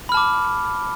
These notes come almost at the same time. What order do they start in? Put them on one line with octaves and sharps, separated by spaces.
B5 F6 A5 D6